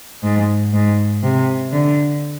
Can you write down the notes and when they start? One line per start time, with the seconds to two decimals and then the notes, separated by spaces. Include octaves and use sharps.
0.23 G#2
0.73 G#2
1.23 C3
1.73 D3